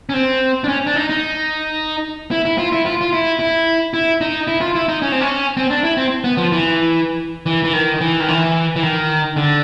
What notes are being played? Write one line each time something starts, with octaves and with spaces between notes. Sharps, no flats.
C#4
C4
D4
C#4
D4
D#4
D#4
E4
E4
F4
E4
F4
F4
E4
E4
E4
D#4
E4
F4
E4
D#4
C#4
C4
C#4
C4
D4
E4
C4
B3
F3
E3
E3
E3
D#3
E3
D#3
E3
E3
D#3
D3